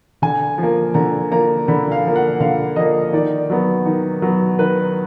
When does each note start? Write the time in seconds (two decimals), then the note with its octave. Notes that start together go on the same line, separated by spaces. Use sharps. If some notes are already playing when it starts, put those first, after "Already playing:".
0.22 D3 G#5
0.58 F3 A#3
0.94 D3 A#5
1.31 F3 A#3 A#5
1.68 D3 B5
1.92 F5
2.05 F3 A#3
2.16 F#5
2.40 D3 F5
2.76 F3 A#3 D#5
3.13 D#3 D5
3.50 F#3 B3
3.85 D#3
4.22 F#3 B3
4.59 D#3 B4